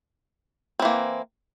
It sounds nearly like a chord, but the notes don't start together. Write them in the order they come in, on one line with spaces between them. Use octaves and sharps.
C4 E3 A#3